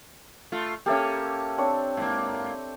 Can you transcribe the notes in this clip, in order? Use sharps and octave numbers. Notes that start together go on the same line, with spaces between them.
A3 F4
A#3 C#4 G4 A4 E5
C4 D4 C#5
G#2 A#3